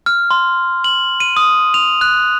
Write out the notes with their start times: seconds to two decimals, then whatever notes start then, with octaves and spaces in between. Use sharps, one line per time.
0.06 F6
0.31 C6
0.84 F#7
1.20 D#7
1.37 D#6
1.74 F7
2.01 F#6